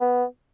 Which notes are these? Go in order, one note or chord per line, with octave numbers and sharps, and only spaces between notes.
B3